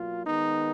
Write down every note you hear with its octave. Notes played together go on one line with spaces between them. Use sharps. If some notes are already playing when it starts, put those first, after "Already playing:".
Already playing: B2 F#3 A#3 F4
D#3 G#3 B3 D#4